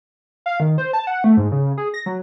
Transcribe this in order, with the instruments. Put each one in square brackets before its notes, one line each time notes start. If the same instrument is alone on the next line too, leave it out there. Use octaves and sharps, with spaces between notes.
[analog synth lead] F5
D#3
C5
A5
F#5
A3
G#2
C#3
G#4
A#6
F#3